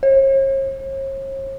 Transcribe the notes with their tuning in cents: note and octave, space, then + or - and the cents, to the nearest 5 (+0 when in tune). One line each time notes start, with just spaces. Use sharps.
C#5 -45